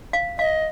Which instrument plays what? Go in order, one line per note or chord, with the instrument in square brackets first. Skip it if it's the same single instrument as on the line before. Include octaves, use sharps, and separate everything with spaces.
[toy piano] F5
[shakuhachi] D#5 [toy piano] F5